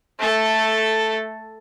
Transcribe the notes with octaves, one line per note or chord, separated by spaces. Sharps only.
A3 A4